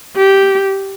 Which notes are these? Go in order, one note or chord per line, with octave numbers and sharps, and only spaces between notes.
G4